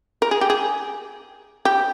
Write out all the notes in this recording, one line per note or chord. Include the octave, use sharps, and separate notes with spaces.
A#4
G#4
G4
G#4
G4